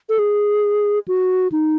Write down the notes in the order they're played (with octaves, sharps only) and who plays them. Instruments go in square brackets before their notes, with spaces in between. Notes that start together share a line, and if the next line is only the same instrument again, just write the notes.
[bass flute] A4
G#4
F#4
D#4